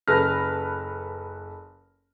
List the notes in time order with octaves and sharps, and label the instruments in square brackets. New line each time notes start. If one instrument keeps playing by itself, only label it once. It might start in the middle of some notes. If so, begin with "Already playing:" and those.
[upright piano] F#1 A4 B4 F6 A#6